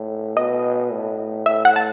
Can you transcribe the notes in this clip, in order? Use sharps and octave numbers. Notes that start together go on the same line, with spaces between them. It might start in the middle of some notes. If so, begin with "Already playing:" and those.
Already playing: A2
B2 D#5
A2
A2 E5
F#5
A5